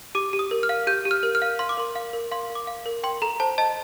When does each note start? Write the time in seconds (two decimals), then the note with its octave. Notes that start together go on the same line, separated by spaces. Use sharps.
0.15 G4 D6
0.33 G4
0.39 D#6
0.51 A#4
0.63 F6
0.69 F5
0.87 G4 G6
1.05 G4
1.11 F6
1.23 A#4
1.35 F6
1.42 F5
1.59 F5 C6
1.69 D6
1.77 A#4 C6
1.95 F5
2.13 A#4
2.31 F5 C6
2.50 A#4
2.55 D6
2.67 F5
2.86 A#4
3.04 G5 C6
3.22 A4 A#5
3.40 C5 A5
3.58 D#5 A5